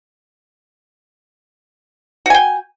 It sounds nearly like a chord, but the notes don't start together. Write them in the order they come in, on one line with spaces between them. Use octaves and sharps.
F#4 G#5 G5